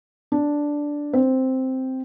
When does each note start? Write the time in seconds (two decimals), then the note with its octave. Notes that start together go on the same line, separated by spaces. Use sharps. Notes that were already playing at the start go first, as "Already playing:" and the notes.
0.32 D4
1.13 C4